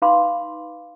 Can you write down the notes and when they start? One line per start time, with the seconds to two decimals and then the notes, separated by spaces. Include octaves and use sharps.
0.02 D#4 B4 F5 B5 C6 D6